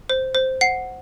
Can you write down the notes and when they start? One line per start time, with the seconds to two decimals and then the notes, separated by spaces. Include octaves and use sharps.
0.10 C5
0.35 C5
0.61 F#5 C7